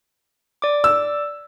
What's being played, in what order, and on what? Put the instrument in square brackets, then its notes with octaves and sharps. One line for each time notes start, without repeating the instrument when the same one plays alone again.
[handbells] D5 D6
[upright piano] E6